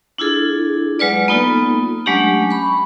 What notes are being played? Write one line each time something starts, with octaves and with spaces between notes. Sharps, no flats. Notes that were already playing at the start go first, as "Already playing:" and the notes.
D4 E4 F4 G#4 A4
F#3 G#3 F4 B4 D5
A#3 B3 D#4 F4 A4
F#3 G#3 A3 C#4 D4 G4
B5 C#6